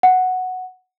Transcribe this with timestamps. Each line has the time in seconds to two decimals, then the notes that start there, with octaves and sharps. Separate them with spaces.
0.03 F#5